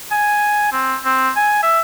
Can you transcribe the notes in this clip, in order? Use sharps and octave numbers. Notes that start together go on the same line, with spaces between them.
G#5
C4
C4
G#5
E5